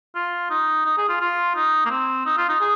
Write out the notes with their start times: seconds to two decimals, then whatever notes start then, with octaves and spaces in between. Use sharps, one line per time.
0.15 F4
0.50 D#4
0.85 D#4
0.97 G#4
1.09 F4
1.20 F4
1.56 D#4
1.85 A#3
1.90 C4
2.26 D#4
2.37 F4
2.49 D#4
2.60 G#4